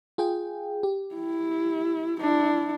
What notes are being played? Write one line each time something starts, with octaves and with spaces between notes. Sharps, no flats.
F4 G#4 G5
G4
E4
D4 E4